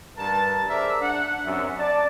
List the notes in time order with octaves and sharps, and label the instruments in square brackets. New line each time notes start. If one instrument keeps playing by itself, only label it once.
[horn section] G2 A#4 B4 A5
G#4 A#4 C5 D5 E5
D4 F#5
F#2 C3 E5
D5 A5